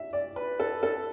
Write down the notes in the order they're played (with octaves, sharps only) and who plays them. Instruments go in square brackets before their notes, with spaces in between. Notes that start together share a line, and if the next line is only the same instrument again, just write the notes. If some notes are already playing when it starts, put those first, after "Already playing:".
Already playing: [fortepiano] E5
D5
B4
A4
A4